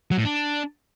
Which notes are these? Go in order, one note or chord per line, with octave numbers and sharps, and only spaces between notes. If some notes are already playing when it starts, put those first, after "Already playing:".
F#3
A2
D4